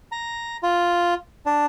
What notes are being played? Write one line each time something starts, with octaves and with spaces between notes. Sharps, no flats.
A#5
F4
D4